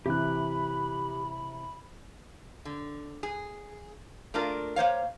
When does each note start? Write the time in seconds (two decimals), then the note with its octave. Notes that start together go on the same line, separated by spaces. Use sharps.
0.06 C3 E3 G4 B5 F#6
2.65 D3
3.23 G#4
4.34 A3 A#3 D4 F4 A#4
4.76 A#3 C5 C#5 F5